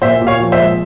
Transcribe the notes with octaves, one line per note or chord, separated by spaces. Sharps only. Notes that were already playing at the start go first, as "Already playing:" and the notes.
A#2 C5 E5
A#2
C#5 F5
F3
C5 E5
G#3